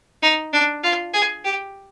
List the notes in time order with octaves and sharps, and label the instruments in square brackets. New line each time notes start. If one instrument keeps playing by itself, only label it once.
[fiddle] D#4
D4
F4
G#4
G4